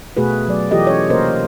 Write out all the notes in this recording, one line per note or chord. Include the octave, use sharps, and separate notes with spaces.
B2 A3 F#4 G#4 B4
F#3 D5
E3 F4 G4 A4 D#5
C#4 C#5
C3 A#3 A#4 C5 D#5